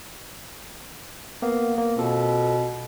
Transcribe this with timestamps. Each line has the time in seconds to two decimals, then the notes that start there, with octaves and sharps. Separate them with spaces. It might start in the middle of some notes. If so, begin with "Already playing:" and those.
1.42 A#3 B3 F5
1.78 A#3
1.97 B2 C4 F4 A4